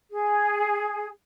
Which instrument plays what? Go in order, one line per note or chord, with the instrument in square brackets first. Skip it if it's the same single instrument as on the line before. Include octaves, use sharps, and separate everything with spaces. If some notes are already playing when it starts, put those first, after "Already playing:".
[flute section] G#4